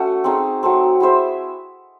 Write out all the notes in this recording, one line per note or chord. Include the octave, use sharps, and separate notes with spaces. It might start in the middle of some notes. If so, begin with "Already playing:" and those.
Already playing: A3 C#4 F#4
C4 D#4 G#4
F#3 A3 C4
E4 G#4 C5 E5